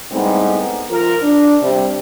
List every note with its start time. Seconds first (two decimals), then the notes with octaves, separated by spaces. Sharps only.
0.12 A2 G3 G#3 B3 C4 D#4
0.90 F3 A#4
1.22 D4
1.62 C3 G3